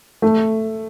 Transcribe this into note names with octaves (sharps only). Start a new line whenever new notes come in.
A3